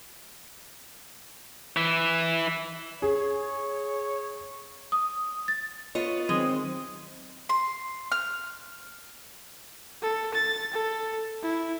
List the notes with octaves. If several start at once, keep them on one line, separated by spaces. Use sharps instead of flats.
E3 E4
G#4 C#5
D#6
A6
B3 F4 C#5 D#5
D#3 F#3 G#3 C4
C6
F6
A4
A6
A4
E4